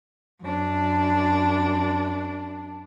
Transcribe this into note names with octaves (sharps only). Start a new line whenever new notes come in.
F#2 D4